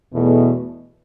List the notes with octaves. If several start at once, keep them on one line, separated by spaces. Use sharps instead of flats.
E2 B2 A3